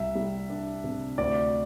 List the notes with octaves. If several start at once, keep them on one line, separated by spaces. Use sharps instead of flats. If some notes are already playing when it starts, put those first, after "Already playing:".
Already playing: C2 E5
G3
D4
C3
D2 D5